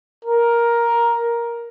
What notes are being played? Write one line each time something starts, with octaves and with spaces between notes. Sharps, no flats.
A#4